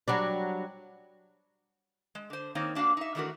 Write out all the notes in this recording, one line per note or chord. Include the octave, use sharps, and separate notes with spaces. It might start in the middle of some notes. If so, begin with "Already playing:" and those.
F#3 G3 D4
G#3
D3 C5
D#3 A#3 C4 D#4 C#5
A#3 D4 F#4 F5
D#4 E5
D#3 E3 A3 D4 F#4 A#4